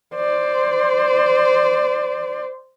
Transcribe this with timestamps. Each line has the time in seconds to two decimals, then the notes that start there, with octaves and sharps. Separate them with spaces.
0.15 C5 D5